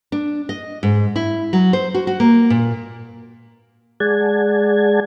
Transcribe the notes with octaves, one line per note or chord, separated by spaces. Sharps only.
D4
D#5
G#2
E4
F#3
C5
F#4
F#4
A#3
A#2
G#3 G#4 D5 F#5 A5 G#6